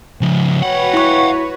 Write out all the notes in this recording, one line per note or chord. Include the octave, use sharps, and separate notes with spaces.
C#3 F3
F#4 B4 C#5 F5 F#5
E4 C#6